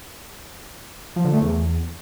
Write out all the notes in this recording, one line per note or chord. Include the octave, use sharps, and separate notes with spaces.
F3
D3
A3
E2